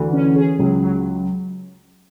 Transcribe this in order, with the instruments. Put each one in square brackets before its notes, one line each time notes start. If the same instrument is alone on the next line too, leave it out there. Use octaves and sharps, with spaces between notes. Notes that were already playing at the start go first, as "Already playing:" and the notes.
Already playing: [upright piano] D2 D3 [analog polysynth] E3
[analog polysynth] C#4
G#4
[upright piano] C#2 C#3 [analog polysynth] F#3
[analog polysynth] F#3